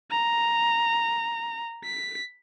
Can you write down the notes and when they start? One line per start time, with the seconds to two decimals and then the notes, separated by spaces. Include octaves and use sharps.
0.11 A#5
1.84 B6